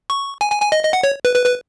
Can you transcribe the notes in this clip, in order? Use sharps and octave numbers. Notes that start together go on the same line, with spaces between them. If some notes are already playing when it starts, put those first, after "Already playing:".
C#6
G#5
G#5
G#5
D#5
D#5
F#5
C#5
B4
B4
B4